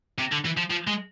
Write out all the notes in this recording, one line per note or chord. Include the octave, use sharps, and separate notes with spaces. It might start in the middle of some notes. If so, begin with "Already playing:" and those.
C3
D3
E3
F3
F3
G#3